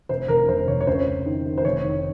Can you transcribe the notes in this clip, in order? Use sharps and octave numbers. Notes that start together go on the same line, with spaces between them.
F1 C5
F1 A#4
F1 C5
F1 C#5
C#5
C#2 C5
C#2
D#3
D#3
C5
F1 C#5
D#3